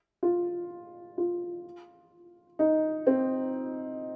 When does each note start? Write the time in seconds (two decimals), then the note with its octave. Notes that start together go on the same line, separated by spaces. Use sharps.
0.23 F4
1.18 F4
2.59 D#4
3.07 C4